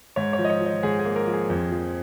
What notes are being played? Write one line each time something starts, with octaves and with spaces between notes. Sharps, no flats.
G#2 C#5
C#5
F3
D#5
C#5
F3
D#5
G#2 G#4
G#4
A#3
A#4
F3
G#4
F2
F3